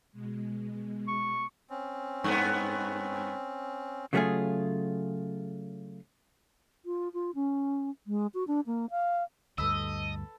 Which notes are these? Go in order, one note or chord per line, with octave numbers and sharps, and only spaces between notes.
B2 G#3
C#6
C4 C#4
G2 B3
C#3 F#3 A3 B3 F4 G#4
F4
F4
C#4
G#3
F#4
D4
A#3
F5
D2 G2 A4 B4 D#5 E6